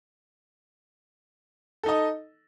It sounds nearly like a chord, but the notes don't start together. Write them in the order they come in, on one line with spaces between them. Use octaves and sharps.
A4 D#4 D#5